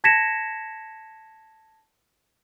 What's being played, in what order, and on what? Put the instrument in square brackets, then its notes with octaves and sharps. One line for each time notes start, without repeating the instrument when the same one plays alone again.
[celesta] A5 G#6 A#6 B6 C#7 E7